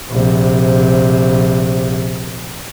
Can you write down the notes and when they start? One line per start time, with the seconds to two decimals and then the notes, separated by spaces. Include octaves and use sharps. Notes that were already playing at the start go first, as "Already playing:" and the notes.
0.10 A#1 C3